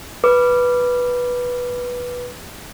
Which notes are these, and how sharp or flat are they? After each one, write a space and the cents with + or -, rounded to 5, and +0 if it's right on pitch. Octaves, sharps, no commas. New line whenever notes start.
B4 -10 D6 +0